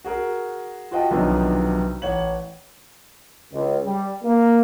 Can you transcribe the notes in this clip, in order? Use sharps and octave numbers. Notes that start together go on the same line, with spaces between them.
F#4 G#4 A#4
F4 F#4 C5 D#5 G5 A5
B1 C3 D#3 F3 B3 D4
A1 C#5 F#5 F#7
C#2
G3
A#3